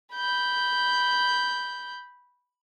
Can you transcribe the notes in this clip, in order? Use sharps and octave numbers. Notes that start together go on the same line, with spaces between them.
B5 G6